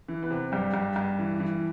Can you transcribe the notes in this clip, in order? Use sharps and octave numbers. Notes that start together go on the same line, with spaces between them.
E3
B3 B4
C3
G2 G3 G4
G2
G2
E3
E3